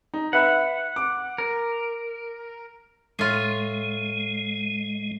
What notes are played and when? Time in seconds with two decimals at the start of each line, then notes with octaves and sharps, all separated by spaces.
0.14 D#4
0.33 B4 E5 F#5 B5
0.96 D6
1.38 A#4
3.19 A2 G#3 F4